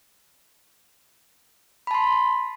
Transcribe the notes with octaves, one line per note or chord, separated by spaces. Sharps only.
A5 B5 C6